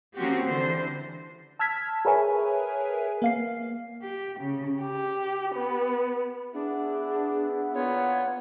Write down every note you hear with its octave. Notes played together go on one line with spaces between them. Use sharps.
F3 A#3 C4 C#4 F#4 G4
D3 E3 C5
A5 E6 F6 G#6 B6
G#4 A#4 B4 C#5 E5 G#5
A#3 F5 C7
G4
C#3
G4
B3
B3 D4 E4 G#4
A#2 B3 F4 C#5